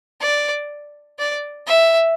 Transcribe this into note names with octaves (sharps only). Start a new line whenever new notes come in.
D5
D5
E5